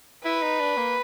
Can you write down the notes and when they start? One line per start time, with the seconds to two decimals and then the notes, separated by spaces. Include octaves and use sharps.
0.25 E4 B4
0.42 D#4
0.60 D4
0.77 A#3